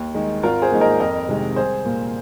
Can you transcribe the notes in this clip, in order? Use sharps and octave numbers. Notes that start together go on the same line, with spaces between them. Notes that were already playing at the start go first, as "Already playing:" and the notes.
Already playing: D#2
D#3 G#3
G#1 F4 A#4
G#4 C5
G#2 D#3 A#3
A#4 D#5
F2 A#4 D#5
C3 D#3 G#3
C2 G#4 C5
A#2 A#3